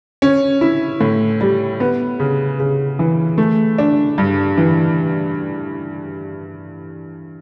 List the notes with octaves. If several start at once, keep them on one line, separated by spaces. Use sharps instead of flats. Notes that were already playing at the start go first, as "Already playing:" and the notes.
C#4
E4
A2
G3
B3
C#3
C#3
E3
A3
D4
G2
E3